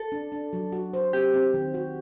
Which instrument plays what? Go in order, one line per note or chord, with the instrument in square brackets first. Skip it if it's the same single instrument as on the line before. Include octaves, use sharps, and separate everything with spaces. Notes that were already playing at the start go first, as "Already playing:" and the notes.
Already playing: [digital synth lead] A4
[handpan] D4
D4
F#3
F#4
C5
[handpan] C4 [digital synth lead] G4
[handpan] C4
D#3
F#4